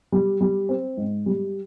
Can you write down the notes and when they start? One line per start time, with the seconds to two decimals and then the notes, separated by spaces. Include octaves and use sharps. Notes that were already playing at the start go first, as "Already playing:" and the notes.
0.12 G3
0.41 G3
0.69 C4
0.97 G#2
1.26 G3